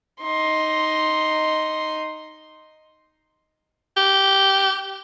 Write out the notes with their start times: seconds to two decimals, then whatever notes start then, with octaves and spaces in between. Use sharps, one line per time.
0.21 D#4 C6
3.97 G4